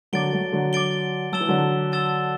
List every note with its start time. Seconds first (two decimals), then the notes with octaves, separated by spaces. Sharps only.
0.13 D3 F#3 D6 A6 D7 G7
0.33 F#3 A3
0.52 D3 F#3
0.73 D6 A6 D7 G7
1.32 F#3 A5 E6 A6 E7 G7
1.40 E3
1.48 D3 F#3
1.92 A5 E6 A6 E7 G7